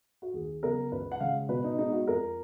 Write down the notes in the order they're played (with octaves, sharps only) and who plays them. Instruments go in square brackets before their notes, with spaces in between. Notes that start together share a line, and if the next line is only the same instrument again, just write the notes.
[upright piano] F#4
D#2 G#4
C#3 F#3 B3 A#4
C#2 B4
F#5
C#3 G#3 F5
B2 B4
D#4
G#3 B3 D#4
F#4
F2 A#4